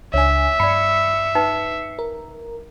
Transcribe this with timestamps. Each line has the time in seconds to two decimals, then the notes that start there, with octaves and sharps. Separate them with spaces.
0.14 C#2 D4 C#5 E5 G#5
0.60 G2 D5 B5 C7 C#7
1.35 D#4 B4 G5
1.99 A#4